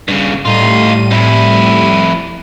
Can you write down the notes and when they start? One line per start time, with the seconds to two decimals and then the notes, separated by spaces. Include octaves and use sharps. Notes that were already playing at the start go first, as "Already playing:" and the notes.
0.08 G2 C#3
0.45 A2 G3 D#4 F4 D#7
1.11 F2 E4